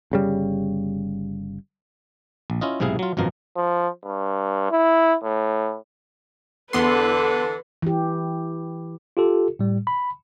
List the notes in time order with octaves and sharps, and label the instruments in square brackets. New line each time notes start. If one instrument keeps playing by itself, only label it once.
[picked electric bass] G1 C#3 G3
[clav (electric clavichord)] A#1
C#4 E4 F4 D#5
B1 G#2 C3 E4 G#4 F5
F#3 F4
G#1 F#2 B2 F3 A#4
[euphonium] F3
G2
E4
A2
[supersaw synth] E2 B3 C6 [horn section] D3 E3 [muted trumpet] A4 [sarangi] B4
[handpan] E3 G4
[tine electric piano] F4 G4 A4
A2 G3
B5